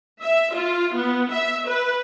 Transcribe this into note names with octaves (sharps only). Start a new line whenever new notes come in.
E5
F4
B3
E5
B4